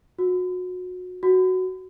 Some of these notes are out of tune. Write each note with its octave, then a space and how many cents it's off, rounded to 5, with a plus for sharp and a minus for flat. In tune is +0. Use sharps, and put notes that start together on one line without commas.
F#4 -25
F#4 +5